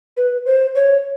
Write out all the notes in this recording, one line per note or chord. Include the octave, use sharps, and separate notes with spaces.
B4
C5
C#5